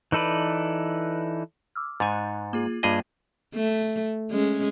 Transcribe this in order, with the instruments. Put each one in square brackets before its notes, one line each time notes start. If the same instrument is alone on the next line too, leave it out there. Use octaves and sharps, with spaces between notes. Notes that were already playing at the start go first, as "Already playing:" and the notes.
[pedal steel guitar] E3 D#4 A4 B4 D5
[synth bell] D6 E6 F6
[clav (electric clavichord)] G#2 G#5 [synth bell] G#3 D#4 A6
[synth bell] A#3 F4 G#4
[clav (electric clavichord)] G2 G#4 D#5 [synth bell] A#3 F4 G5
[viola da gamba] A3
G#3 C#4